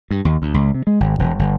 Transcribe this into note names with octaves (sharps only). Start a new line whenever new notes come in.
G2
D#2
D2
C#2
C3
G#3
G#1
E1
G1